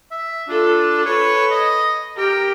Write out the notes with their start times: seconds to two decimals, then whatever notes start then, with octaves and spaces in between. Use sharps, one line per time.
0.11 E5
0.48 D4 F4 A4
1.05 A4 B4 C#5
1.51 D#5
2.17 G4 A#4 G5